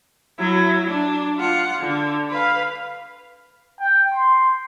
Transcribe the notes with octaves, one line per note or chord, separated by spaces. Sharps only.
F#3 E4
D4
F4 F#5
D3
B4 F5
G5
C6